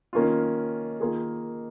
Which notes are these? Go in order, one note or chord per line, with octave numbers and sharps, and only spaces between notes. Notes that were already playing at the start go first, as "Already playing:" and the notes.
D#3 A#3 C#4 F4
D#3 A#3 F4 G#4